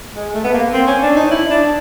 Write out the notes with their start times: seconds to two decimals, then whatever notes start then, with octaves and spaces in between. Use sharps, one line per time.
0.15 G#3
0.34 A3
0.44 B3
0.53 A#3
0.73 C4
0.87 C#4
1.02 D4
1.16 D#4
1.31 E4
1.50 D4